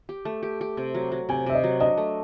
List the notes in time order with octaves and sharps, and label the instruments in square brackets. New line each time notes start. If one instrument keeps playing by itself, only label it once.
[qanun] G4
A3
G4
G4
C3
F#3
F#3
[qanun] C3 [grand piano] G#5
[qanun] C3 [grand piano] E5
[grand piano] D#5
[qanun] F#3
[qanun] D4 [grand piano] D#5
[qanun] A3